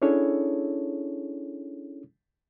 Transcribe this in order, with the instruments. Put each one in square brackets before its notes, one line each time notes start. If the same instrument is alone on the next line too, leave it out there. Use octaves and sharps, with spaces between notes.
[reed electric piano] C#4 D4 E4 G#4 A4 C#5